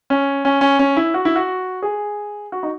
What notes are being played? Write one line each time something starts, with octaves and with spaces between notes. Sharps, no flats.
C#4
C#4
C#4
C#4
E4
F#4
E4
F#4
G#4
F#4
D#4